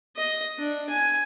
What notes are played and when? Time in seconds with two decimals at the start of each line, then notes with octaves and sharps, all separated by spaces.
0.16 D#5
0.58 D4
0.90 G#5